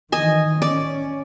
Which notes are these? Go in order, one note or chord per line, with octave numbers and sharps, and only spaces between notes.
D#3 E3 D#5 G#5
C#4 D5